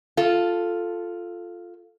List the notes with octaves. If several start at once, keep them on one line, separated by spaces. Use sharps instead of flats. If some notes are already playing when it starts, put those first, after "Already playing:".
F4 A4